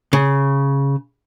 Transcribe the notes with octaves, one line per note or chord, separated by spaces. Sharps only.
C#3